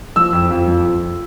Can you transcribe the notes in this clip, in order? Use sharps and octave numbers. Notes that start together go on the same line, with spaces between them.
F3 E6
F2
F2
F3
F2